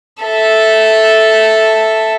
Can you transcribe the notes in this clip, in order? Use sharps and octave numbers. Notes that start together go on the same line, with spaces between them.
A4 E5